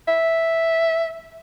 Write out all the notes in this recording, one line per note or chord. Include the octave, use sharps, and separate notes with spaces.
E5